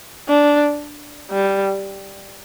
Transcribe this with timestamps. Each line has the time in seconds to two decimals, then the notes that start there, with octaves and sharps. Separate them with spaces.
0.28 D4
1.30 G3